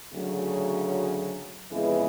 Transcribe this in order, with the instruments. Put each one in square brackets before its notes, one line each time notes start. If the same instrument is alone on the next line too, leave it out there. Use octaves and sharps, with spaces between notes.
[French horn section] D2 C#3 F#3 A3
F2 C#3 E3 G#3 B3